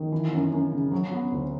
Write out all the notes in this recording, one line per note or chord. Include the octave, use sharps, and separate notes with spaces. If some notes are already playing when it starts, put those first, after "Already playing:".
Already playing: D#3
E3
F#2
F#2
C#3
F#3
B3
D2